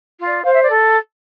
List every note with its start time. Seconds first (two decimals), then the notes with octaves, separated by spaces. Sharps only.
0.19 F4
0.27 D5
0.44 C5 F5
0.53 E5
0.62 D5
0.69 A4